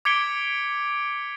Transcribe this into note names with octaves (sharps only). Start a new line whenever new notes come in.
D6 G#6 B6 C#7 D7 G7